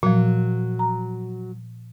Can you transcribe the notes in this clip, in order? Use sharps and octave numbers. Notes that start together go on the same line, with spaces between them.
A#2 F3 F#3
A#5